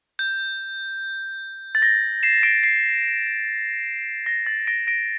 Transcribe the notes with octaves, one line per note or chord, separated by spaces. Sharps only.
G6
A6
A#6
C7 E7
A#6 D7
C7
A#6
A6
A#6 D7
A#6 D7